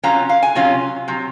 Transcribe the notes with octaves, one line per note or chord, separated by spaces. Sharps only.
C3 F#3 C#4 F4 A#5
F5
G#5
C3 F#3 C#4 F4
C3 F#3